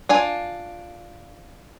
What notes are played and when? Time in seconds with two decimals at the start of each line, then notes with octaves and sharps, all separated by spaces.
0.09 D4 F4 G#5